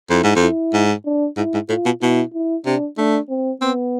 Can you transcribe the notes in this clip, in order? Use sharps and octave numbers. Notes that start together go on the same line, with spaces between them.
F2 E4
G#2
F2
E4
G#2
D4
G#2 E4
G#2
A2 F4
B2
B2 E4
E4
C3 D4
A3 D4
C4
B3 C4